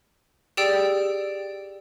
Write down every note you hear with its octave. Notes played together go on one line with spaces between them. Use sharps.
G4 G#4 D5 G5 E6